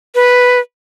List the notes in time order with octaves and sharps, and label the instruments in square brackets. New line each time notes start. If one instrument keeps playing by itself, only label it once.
[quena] B4